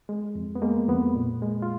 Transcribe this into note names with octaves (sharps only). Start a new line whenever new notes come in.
G#3
F2
B3
G#3 A#3
F2 B3
A#2
G#3
F4